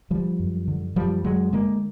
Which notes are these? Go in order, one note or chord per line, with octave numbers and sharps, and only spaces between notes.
D3 F3 G3
F#2
D3
F#2 F3 G3
D3 F#3 G#3
D3 G#3 A#3